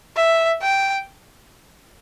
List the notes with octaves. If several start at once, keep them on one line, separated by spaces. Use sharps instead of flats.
E5
G5